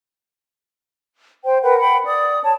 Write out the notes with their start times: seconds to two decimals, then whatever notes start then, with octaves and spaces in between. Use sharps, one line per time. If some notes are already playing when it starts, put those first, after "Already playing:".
1.44 C5 G5
1.62 A#4 B4 F#5 G5
1.79 F#5 G5 B5
2.05 D5 D#6
2.44 C#5 A5